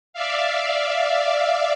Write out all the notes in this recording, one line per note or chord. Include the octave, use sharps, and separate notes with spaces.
D5 E5 F5